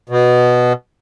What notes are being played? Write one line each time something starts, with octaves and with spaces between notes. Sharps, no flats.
B2